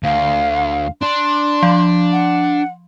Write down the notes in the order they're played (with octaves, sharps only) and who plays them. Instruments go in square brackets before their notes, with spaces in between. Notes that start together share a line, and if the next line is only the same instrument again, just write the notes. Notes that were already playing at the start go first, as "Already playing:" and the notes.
[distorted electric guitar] D2 [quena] F5
[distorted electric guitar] D4 [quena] C6
[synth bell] F3
[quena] F#5